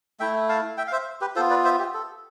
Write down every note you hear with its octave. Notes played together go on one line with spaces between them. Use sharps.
A3 E4 E5 G5
F5 A5
E5 G5
F5
C5 E5
G4 B4
B3 F4 A4 C5
B4 D5
C5 E5
G4
A4